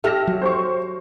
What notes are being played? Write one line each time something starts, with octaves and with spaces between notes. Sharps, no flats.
G4 A4 E5 F6 A#6
F#3
C5 C6 C#6